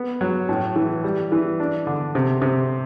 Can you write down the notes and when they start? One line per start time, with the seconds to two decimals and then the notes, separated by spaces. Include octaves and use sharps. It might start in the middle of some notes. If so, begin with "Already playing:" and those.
Already playing: B3
0.21 F#3
0.49 A2
0.76 E3
1.04 G3
1.32 E3
1.60 D4
1.87 D3
2.15 C3
2.42 C3